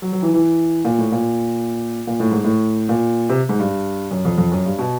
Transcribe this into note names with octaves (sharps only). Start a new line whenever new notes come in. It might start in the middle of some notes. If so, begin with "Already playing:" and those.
F#3
F#3
E3
E3
A#2
A2
A#2
A#2
A2
G#2
A2
A#2
C3
G#2
G2
F#2
F2
F2
F#2
G2
B2